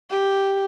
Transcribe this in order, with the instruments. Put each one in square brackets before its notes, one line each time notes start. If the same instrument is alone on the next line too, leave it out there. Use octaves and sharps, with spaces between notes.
[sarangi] G4